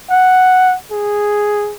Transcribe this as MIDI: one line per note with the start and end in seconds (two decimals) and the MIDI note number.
0.10 0.75 78
0.91 1.76 68